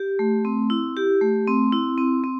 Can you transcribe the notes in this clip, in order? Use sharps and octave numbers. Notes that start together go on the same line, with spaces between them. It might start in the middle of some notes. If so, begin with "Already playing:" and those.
Already playing: G4
A3
C4
E4
G4
A3
C4
E4
C4
C4